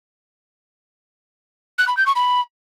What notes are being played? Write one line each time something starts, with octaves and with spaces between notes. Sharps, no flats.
F#6
B5
G6
C#6
B5